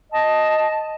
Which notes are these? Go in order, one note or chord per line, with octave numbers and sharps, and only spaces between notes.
D#5 A5